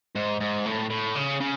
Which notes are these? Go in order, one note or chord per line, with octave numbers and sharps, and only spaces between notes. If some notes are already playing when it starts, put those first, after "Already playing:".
G#2
G#2
A2
A2
C#3
C#3